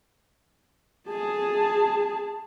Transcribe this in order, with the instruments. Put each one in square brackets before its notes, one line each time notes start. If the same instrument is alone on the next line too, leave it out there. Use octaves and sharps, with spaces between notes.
[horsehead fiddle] G#4 A5